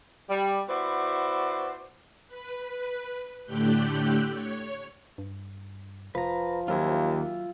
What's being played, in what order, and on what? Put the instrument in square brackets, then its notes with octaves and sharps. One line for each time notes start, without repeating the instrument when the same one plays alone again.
[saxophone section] G3
B3 E4 F#4 C5 D5
[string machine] B4
A2 D3 A3 G4 F#6 G6
C#5
[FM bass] G2
[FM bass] F1 [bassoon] F3 [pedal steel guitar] B4 A#5
[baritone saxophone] D#2 [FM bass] F#3 [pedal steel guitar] F4 E5 G#5